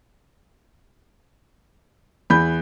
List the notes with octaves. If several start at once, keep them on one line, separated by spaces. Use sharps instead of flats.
E2 B5 G6